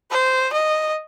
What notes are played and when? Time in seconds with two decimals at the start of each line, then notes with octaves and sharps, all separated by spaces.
0.11 C5
0.53 D#5